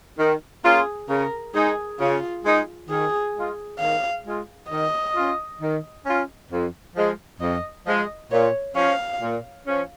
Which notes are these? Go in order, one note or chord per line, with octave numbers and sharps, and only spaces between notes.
D#3
A#3 C#4 F4 G#4
C#3 A#4
G#3 D#4 G#4
C#3 F4
G#3 D#4
D#3 G#4
G#3 F4
D#3 F5
G#3 F4
D#3 D#5
C#4 F4
D#3
C#4 F4
F2
F3 G#3
F2 D#5
F3 G#3 D#5
A#2 C#5
F3 C#4 F5
A#2
F3 C#4